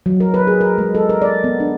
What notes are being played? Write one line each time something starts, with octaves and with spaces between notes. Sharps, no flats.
F#3
A#4
B4
G#4
A#4
G#3
A4
A#4
D5
B3
D4